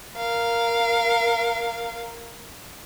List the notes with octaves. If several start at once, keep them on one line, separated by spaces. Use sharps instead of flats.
A#4 F5